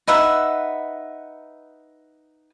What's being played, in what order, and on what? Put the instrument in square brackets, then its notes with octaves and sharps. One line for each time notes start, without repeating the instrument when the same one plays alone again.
[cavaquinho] D#4 B4 E5 F#5